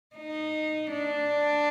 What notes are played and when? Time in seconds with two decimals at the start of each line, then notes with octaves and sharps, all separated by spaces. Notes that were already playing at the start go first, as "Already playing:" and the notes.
0.16 D#4
0.91 D4